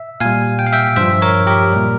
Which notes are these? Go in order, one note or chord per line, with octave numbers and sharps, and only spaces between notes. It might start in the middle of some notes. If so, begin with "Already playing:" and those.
Already playing: E5
A#2 G3 F5 G#5
G5
F5
E5 G5
G2 F3 C5 E5
A#4 C#5
G4 A#4
A#2 G3